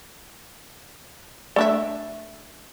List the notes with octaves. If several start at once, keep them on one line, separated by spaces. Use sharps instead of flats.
A3 D4 D5 E5